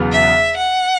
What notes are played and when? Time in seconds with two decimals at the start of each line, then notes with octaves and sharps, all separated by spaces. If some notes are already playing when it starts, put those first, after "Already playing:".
Already playing: E1 E2 C#3 F#3 B3
0.12 E5
0.57 F#5